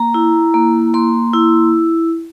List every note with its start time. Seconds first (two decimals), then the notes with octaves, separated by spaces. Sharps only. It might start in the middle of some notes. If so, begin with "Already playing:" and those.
Already playing: A#3 A#5
0.14 E4
0.54 A#3
0.94 A#3 C6
1.33 E4